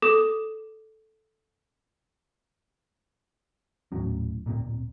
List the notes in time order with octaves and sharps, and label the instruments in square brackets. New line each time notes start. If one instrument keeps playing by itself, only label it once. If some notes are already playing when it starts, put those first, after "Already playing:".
[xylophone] A4 D6 D#6 E7
[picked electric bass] D#1 A2 F#3 C#4
D1 A#2 A#3 C4